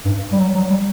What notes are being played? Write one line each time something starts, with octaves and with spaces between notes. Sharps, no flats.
G2
G3
F#3
F#3
G3